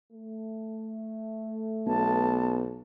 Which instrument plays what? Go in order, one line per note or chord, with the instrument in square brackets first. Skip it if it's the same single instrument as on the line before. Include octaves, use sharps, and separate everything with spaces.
[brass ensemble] A3
[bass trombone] B1 [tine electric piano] B3 [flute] A5